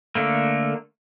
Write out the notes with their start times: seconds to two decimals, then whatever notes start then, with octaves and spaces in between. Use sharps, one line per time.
0.15 D3 A3 A#3